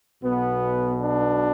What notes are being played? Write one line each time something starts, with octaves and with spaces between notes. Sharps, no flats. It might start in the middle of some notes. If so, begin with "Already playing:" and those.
B1 B2 B3
D4